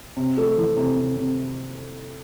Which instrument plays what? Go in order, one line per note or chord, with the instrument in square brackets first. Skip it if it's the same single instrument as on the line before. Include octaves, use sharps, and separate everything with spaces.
[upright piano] C3
A3
E3
C3
C3
C3